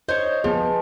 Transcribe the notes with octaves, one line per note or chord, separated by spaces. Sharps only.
C5 C#5 D#5
F3 B3 G#4